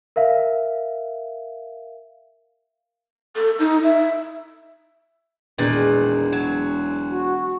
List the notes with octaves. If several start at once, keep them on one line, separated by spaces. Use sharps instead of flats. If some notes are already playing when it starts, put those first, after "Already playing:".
A#4 E5 F5
A4
D#4
E5
E1 A#2 D#3 G#3 B4
F#3
F#4